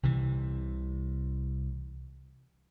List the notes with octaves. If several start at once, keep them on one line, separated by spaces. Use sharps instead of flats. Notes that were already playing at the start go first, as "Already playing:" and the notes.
C2 C3 E3